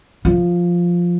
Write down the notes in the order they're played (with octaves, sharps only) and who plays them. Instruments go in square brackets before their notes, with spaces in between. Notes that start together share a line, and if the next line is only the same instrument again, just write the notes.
[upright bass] F3